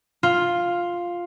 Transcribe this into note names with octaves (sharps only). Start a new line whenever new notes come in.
F4